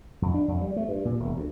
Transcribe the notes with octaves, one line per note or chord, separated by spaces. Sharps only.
F2
D4
F2
G3
A3
G2
A#2
E1
D2